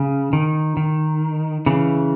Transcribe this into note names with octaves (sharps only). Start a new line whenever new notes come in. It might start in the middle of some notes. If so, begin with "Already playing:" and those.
Already playing: C#3
D#3
D#3
C#3 E3